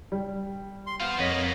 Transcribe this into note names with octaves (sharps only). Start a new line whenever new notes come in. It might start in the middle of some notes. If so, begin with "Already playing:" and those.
G3
C6
B3 F4 C5 F5
F2 A#3 B3 C#5 D#5 B6